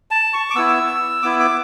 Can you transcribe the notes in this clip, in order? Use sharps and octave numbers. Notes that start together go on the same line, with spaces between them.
A5
C#6
D6
B3 E4 E6
B3 E4 D6
D6